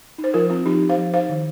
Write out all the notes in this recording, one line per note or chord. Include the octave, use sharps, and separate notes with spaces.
D#4
C5
F3 F4 A#4
C4 F4
F3 D#4 G4
D#4
C5 F5
F3
D#4 C5 F5
D#3